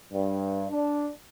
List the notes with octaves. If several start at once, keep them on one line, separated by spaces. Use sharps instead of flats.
G2
D4